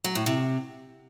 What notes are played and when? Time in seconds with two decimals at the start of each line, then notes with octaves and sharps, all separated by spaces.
0.04 F#3
0.15 A2
0.26 C3